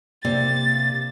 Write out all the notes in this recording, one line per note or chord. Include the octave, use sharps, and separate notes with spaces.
C3 A#3 D5 A6